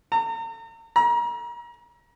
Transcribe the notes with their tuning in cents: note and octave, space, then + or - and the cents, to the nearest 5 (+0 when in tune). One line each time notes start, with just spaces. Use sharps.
A#5 -40
A#5 +35